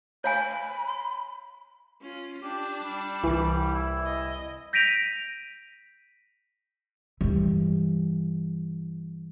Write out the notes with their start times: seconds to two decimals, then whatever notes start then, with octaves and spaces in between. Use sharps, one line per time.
0.24 C#5 F5 G#5 B5
2.02 C#4 F4
2.43 D4 G4
2.83 G3
3.23 C2 E3
3.74 E4
4.06 D#5
4.73 G6 A#6 B6 D7 D#7 F7
7.21 G2 E3